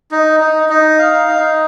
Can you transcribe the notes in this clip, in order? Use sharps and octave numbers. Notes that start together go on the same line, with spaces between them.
D#4
D#4
D#4
F5
D#4